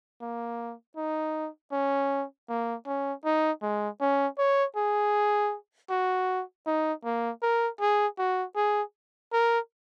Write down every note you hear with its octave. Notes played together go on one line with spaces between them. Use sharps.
A#3
D#4
C#4
A#3
C#4
D#4
G#3
C#4
C#5
G#4
F#4
D#4
A#3
A#4
G#4
F#4
G#4
A#4